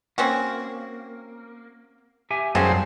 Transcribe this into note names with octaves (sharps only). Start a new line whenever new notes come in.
A#3 C4 C#4 F#4
G4 E5 G#5
F#2 G3 C4 C#4 G#4 C5 F5 A5